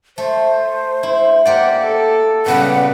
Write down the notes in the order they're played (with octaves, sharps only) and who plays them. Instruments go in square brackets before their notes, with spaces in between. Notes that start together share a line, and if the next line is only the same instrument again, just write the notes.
[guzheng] A3 [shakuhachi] C5
[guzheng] E4
[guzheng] A#3 G4 D5 [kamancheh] F#5
[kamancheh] A4
[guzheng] A#2 C#3 G3 [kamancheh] B3 B4 [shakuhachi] F#5